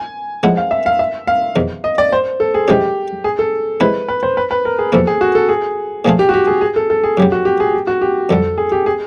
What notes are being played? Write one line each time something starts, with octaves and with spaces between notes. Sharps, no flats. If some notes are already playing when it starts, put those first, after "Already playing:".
Already playing: G#5
A2 F3 G#3 C4 E4 F#5
F5
E5
F5
E5
F5
E2 C3 D#3
D#5
D5
C5
A4
G#4
C3 E3 G#3 C#4 G4
G#4
A4
C3 E3 G#3 C4 E4 B4
B4
C5
B4
B4
A#4
G#4
E2 C3 F3 A#3 A4
G#4
F#4
A4
G#4
A#2 F3 A3 C4 F4 G#4
G4
F#4
G4
G#4
G#4
A4
A4
G#4
F#2 C#3 F#3 G4
F#4
G4
G#4
G4
F#4
G4
F2 D3 G3 A4
G#4
G4
G#4